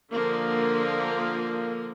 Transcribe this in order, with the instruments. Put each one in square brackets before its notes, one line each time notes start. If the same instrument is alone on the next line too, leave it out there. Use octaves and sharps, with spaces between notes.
[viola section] D3 F3 A#3